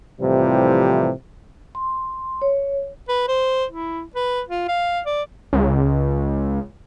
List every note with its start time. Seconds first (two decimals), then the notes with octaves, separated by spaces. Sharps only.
0.21 F2 A2 C3 E3 F3 G3
1.75 C6
2.42 C#5
3.08 B4
3.28 C5
3.71 E4
4.16 B4
4.49 F4
4.68 F5
5.06 D5
5.53 C#2